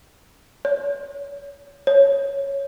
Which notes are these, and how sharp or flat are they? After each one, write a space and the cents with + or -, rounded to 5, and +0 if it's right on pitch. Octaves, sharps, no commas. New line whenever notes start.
C#5 +30
C#5 +0